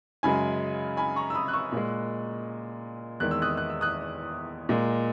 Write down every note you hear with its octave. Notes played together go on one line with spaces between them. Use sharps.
F#2 C#3 G#3 G#5 B5
G#5 B5
A#5 C#6
E6
B5 D#6
F#6
C#6 E6
A#2 G#3
E2 D#3 G#3 F#6
E6
D#6 F#6
F#6
E6
D#6 F#6
A#2 G#3